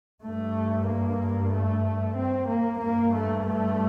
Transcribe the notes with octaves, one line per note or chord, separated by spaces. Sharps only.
G2 A3
A#3
A3
C4
A#3
G2 A#3
A3
A3